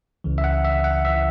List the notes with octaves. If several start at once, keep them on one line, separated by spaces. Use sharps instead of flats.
C#2 C#3 E3
E5
F#5
E5
F#5
C#2 C#3 E3 E5